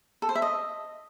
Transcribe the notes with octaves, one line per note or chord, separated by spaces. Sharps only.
A4
C5
E5
D#5